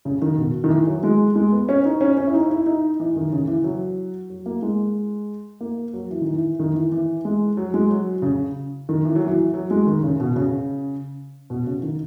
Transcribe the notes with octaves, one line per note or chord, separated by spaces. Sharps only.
C#3
D#3
B2
D#3
E3
F#3
G#3
G#3
B3
C#4
D#4
C#4
C#4
E4
D#4
E4
D#4
E3
D#3
C#3
E3
F#3
F#3
A#3
G#3
A#3
F#3
E3
D#3
E3
D#3
E3
E3
G#3
F#3
G#3
F#3
C#3
D#3
E3
F#3
E3
F#3
G#3
D#3
C#3
B2
C#3
B2
C#3
D#3